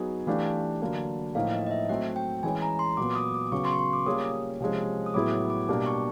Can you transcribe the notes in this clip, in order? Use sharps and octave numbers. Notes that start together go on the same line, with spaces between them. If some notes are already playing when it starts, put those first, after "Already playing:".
Already playing: F#3 B3 D#4 G#4
E3 A3 D4 G4 F5
D3 F#3 A#3 D4
A2 F3 A#3 D#4 F5
D#5
D#5
E5
F#3 A3 C4 F#5
G5
E3 G#3 C#4 G#5
A#5
C6
A#2 F#3 B3 D6
D6
D#6
D6
C#3 F#3 B3 C#6
C6
C#6
C6
D6
G3 A#3 C#4 F4 G#4 D#6
C3 F3 G#3 C#4
D#6
A2 F#3 B3 E4 G#4 D6
D6
B2 G3 A#3 D4 G4 D6
C#6